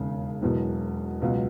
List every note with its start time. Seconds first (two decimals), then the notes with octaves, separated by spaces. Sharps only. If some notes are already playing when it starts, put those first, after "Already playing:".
Already playing: E1 D#2 C#3
0.41 E1 E2 B2 F#3
1.22 C#2 B2 F#3